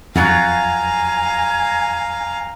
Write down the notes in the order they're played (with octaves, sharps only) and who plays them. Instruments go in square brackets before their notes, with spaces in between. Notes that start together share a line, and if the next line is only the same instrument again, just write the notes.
[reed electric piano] F2 [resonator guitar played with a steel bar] F#3 F4 F#4 [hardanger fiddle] F5 A#5 [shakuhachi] G#5